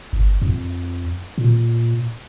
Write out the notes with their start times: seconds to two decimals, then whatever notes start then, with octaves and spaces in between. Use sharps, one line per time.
0.13 G1
0.42 F2
1.38 A#2